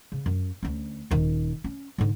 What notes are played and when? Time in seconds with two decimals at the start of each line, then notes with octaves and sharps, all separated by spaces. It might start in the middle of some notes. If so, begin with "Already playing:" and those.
0.12 C#3
0.26 F#2
0.63 D2 C#4
1.11 D#1 D#3
1.64 C#4
1.98 G#2 D3